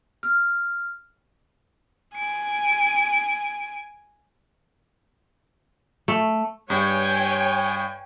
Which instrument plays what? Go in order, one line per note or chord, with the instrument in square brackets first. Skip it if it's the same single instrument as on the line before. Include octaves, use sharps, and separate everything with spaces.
[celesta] F6
[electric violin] G#5 D7
[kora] A3
[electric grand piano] G2 [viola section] C#5 G5 G#5